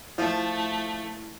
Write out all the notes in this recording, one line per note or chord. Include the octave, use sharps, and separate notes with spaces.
F3 A3 E4